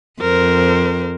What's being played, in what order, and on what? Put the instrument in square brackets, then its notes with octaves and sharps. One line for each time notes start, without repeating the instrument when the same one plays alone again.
[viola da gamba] F2 [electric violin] A#4 C5